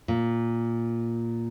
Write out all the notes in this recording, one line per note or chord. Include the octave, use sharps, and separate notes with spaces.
A#2